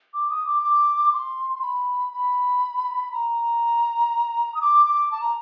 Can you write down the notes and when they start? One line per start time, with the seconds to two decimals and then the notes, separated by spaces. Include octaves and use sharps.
0.13 D6
0.30 D#6
0.46 D6
0.62 D6
1.13 C6
1.55 C6
1.62 B5
2.13 B5
3.12 A#5
4.54 D#6
4.61 D6
4.86 D6
5.11 A5
5.21 A#5